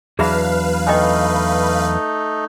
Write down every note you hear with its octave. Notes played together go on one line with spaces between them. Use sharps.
E2 F#3 D4 G#4 B4 E5 F5 B5
A3 D#4 D#5 G5 G#5